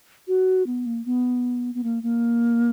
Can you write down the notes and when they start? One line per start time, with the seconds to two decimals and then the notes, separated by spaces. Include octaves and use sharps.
0.28 F#4
0.67 B3
0.86 A#3
1.05 B3
1.75 B3
1.84 A#3
2.03 A#3